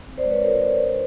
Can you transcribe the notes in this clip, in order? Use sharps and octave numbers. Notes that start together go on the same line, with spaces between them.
C4
C5 D5
G#3
B4 C#5
F4 A#4 C5
F4
D4